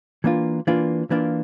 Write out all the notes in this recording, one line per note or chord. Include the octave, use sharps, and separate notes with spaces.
E3 A#3 D4 F4
E3 A#3 D4 F4
E3 A#3 D4 F4